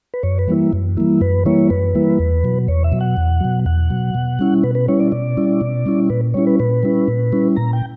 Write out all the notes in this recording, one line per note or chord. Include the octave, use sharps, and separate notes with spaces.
B4
F#2 C#5
B4
E3 G3 A#3 E4
F#2
E3 G3 A#3 E4
F#2 B4
E3 G3 A#3 E4 C#5
F#2 B4
E3 G3 A#3 E4
E2
B2 F#3
E2 C#5
E5
B2 F#3
F#5
E2
B2 F#3
E2 F#5
B2 F#3
B2
G3 C#4 E4
B2 B4
B4
G3 C#4 E4 C#5
D5
B2 D5
G3 C#4 E4
B2
G3 C#4 E4
A#2 B4
G3 C#4 E4 C#5
B4
A#2 B4
G3 C#4 E4
A#2
G3 C#4 E4
A#2 A#5
G5